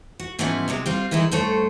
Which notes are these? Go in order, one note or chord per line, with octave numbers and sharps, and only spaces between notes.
F#4
G#2 E3 F3 G3 B3 C#4
C3 F#3 G#3 B3
G3 C4 F4
D#3 E3 G#3 D#4 E4
D2 G2 A3 C5 C#5